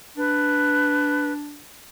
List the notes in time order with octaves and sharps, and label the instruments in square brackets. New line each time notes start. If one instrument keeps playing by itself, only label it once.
[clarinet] D4 [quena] B4